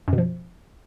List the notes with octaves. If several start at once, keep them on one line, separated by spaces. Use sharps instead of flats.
F#2
B2
F3